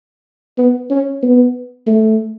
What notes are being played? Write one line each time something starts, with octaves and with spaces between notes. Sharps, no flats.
B3
C#4
B3
A3